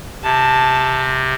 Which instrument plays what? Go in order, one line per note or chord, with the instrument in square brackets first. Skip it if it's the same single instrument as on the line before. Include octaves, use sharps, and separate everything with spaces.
[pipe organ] C3 [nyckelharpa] A5